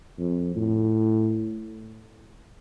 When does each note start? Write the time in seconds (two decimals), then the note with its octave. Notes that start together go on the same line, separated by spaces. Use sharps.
0.18 F2
0.55 A2